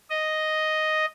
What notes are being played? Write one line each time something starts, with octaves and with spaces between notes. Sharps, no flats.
D#5